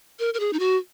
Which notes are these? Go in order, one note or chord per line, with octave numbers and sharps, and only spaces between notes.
A#4
A#4
G#4
D#4
F#4